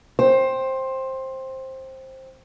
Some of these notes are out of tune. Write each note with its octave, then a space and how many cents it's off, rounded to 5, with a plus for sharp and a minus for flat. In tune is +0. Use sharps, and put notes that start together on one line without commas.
C5 +15 G5 +0